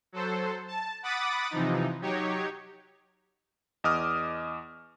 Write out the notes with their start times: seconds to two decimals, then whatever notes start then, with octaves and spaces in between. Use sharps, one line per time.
0.12 F#3 A4 C5
0.68 A5
1.03 F#5 B5 D6 D#6 A6
1.51 C3 E3 F3 D#4
2.01 F#3 D#4 G4 C#5
3.84 E2 D#5 D6 D#6 F6